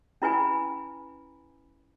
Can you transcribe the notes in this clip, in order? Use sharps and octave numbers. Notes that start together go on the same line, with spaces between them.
C#4 E4 B4 G#5 B5